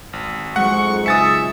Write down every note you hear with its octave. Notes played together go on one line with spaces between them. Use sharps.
G#1
F2 G#2 F#3 G#3 F#5 C#6
C#2 D#4 E5 G#5 D#6 A6 C#7